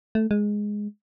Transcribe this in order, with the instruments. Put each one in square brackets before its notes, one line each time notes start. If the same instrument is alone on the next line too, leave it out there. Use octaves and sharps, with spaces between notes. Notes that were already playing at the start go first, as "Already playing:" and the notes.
[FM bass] A3
G#3